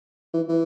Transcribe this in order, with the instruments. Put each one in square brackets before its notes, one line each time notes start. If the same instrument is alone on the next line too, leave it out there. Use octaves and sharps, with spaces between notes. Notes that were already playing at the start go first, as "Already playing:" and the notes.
[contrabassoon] E3
E3